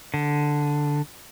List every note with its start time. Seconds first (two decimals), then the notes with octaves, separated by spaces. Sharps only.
0.14 D3